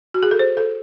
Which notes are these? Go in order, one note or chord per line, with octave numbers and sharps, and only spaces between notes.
F#4
G#4
A4
C5
A4